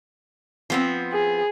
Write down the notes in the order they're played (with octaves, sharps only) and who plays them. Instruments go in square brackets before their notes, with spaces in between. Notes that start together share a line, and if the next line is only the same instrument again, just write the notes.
[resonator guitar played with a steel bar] F3 B3 C4
[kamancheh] G#4